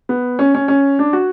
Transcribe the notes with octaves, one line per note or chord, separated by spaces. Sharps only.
B3
C#4
C#4
C#4
D4
F#4